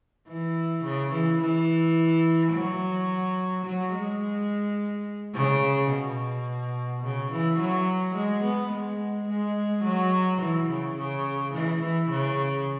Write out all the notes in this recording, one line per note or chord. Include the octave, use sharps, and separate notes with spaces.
E3
C#3
E3
E3
F#3
F#3
G#3
C#3
B2
C#3
E3
F#3
G#3
B3
G#3
G#3
F#3
E3
C#3
C#3
E3
E3
C#3